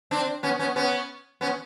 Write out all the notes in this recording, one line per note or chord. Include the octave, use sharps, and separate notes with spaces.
C4 D4
B3 C#4
B3 C#4
B3 C#4
B3 C#4